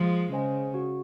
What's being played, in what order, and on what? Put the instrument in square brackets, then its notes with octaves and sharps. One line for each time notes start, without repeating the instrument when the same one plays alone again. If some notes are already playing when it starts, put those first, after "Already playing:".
Already playing: [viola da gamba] F3 G#3
[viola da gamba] C#3 [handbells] C5 D#5 G#5
[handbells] F#4